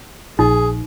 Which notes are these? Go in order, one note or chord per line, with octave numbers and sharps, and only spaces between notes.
A#1 D#4 G#4